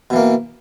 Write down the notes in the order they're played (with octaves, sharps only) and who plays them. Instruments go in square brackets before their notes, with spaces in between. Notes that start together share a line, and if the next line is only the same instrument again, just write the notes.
[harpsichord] B2
E3
A#3